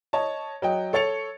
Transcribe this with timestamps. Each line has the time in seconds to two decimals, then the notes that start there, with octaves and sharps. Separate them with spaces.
0.13 C#5 D#5 A5
0.62 F#3 D#5 G5
0.93 A4 C#5 A6 C#7 F7